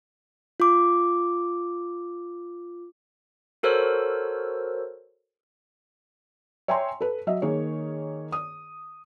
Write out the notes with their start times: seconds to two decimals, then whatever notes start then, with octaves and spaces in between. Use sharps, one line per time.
0.60 F4 D6
3.63 F#4 A4 A#4 C5 C#5 E6
6.68 C#5 E5 G5 G#5 A#5 C6
7.01 A4 B4
7.27 F#3 D#5 E5
7.42 D#3 A#3 G#4 C#5
8.32 D#6